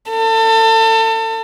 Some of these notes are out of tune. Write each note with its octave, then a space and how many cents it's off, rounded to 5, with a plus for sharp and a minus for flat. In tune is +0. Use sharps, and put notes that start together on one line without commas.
A4 +30